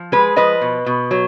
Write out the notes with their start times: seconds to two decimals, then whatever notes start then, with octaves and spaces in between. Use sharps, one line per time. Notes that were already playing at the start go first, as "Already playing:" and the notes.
Already playing: F3
0.12 G#3 G#4 B4
0.36 F3 B4 D#5
0.61 B2
0.86 B2
1.11 F#3